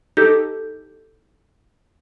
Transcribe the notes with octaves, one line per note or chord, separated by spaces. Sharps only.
D#4 G4 A4 G6